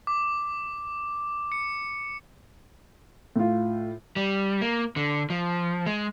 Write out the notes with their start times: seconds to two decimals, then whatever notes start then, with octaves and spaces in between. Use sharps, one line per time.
0.07 D6
1.52 C#7
3.36 A2 F4
4.16 G3
4.61 A#3
4.96 D3
5.30 F3
5.86 G#3